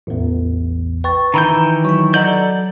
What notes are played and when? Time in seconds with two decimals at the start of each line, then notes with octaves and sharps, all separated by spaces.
0.07 A1 E2
1.04 B4 G5 C#6 A6
1.34 D#3 E3 A#5 B5 G6
1.85 F#3 B5 C#6
2.14 A4 D5 D#5 F#5 A#5 G6